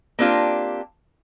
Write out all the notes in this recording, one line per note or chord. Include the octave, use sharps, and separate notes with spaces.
A#3 C4 D4 F4 G4